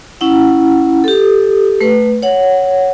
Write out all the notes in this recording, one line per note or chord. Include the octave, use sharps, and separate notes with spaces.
C#4 E4 F#5
G4 A4
A3 B4
C#5 F#5